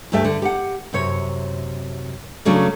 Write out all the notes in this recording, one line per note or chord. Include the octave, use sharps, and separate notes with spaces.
D2 G2 A3 G4 E5
D3
G4 F#5
F#2 C3 C#5
C#3 F#3 A3 C#4 D4